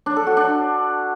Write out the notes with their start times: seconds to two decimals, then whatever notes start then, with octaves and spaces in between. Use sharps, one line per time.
0.06 D4
0.16 A4
0.27 F#4
0.37 D4